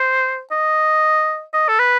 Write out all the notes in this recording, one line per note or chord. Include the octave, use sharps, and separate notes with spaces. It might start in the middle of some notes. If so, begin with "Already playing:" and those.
Already playing: C5
D#5
D#5
A4
B4